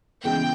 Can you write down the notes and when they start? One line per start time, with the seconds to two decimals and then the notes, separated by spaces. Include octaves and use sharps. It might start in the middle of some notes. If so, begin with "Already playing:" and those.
0.23 C#3 E3 G#3 B3 G5